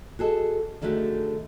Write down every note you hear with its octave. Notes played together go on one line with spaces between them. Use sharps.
F#4 G#4 A4 D#5
D3 D#3 G#3 A3 F#4 G4